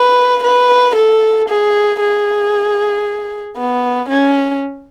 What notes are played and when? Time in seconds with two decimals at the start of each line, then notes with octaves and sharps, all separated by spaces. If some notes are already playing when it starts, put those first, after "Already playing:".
Already playing: B4
0.43 B4
0.95 A4
1.48 G#4
2.00 G#4
3.57 B3
4.09 C#4